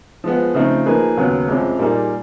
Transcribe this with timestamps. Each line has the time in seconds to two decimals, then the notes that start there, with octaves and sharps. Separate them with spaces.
0.24 F3 G#3 B3
0.54 C#3 F3 A3 C4 D#4
0.86 F3 A#3 D#4 G#4 B4
1.17 D#2 C#3 F#3 B3
1.48 F2 C3 F3 G#3 C#4
1.79 A#2 G3 A#3 D#4 G#4